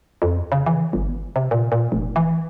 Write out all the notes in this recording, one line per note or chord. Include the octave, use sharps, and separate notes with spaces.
F2
C#3
E3
G1
C3
A#2
A#2
F1
E3